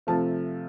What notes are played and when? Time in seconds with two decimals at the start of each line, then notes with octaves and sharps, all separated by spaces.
0.07 C3 F3 A3 A5